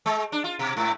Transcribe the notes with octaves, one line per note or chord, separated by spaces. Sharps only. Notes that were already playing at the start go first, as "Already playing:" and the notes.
G#3
D4
F4
B2
G#2